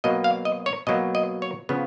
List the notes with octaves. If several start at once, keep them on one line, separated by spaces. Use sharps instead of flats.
B2 F#3 A#3 D#5
F5
D#5
C#5
B2 F#3 A#3 D#5
D#5
C#5
C#3 F3 B3